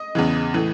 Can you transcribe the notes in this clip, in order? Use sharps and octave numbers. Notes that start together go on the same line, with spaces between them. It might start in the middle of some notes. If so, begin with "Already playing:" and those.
Already playing: D#5
E2 C#3 E3
A2 E3